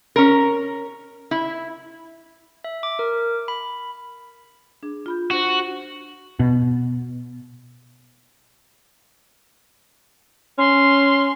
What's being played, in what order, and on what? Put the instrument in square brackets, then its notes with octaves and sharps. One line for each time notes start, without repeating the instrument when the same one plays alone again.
[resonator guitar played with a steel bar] C#4 A#4
E4
[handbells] E5
D6
A#4
B5
[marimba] D4 G#4
F4 B5 G6
[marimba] D4 C5 [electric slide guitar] F#4
[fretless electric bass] B2
[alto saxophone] C#4 [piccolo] C6